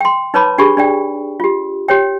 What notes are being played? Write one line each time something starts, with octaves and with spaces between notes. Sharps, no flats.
G5 C6
D#4 B4 C#5 A5 B5 D6
D4 G4 G#4 B5 C#6
D4 D5 G5
F4 G4
G4 C#5 G5